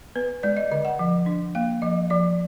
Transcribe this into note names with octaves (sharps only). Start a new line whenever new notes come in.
B3 B4
G#3 D5
D#5
D3 D#5
F#5
F3
D4
A#3 F5
F3 D#5
F3 D5